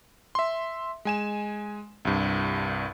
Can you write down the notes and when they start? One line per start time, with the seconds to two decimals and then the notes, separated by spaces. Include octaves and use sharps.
0.35 E5 C6
1.05 G#3 G#5 E7
2.05 C2 G2